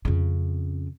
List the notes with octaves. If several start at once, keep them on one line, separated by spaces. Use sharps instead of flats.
F2 C#3